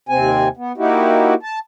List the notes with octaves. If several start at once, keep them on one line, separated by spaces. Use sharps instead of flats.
D#2 C3 C4 G#5
B3
A#3 D#4 E4 F#4 G4
A5